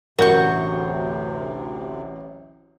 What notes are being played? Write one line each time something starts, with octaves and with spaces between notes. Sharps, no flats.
A1 D2 C3 F#3 F#4 A#4 C#6 G6